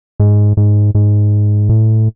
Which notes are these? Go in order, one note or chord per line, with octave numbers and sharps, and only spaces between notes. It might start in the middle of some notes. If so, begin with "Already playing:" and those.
G#2
G#2
G#2
A2